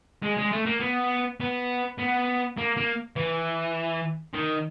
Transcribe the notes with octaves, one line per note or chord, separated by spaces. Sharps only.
G#3
G#3
A3
A#3
B3
B3
B3
A#3
A#3
E3
D#3